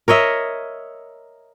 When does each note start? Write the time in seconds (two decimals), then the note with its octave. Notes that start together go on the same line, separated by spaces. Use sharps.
0.08 A#4 C#5 D#5 E5